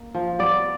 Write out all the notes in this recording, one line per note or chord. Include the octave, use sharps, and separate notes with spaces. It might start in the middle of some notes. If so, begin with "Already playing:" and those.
Already playing: A#3
F3
B3 D5